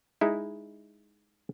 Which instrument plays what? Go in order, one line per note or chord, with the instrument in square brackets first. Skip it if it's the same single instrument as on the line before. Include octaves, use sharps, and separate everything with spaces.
[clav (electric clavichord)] G#3 D#4 E4